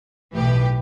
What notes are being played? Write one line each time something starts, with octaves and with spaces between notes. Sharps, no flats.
B1 A2 E3 G4 B4